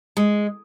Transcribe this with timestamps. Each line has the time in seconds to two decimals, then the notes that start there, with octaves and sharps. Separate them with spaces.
0.17 G#3